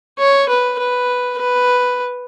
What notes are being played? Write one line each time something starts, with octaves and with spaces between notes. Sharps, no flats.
C#5
B4
B4
B4